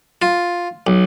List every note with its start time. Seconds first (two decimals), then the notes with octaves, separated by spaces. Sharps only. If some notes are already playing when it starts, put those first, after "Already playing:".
0.22 F4
0.87 B1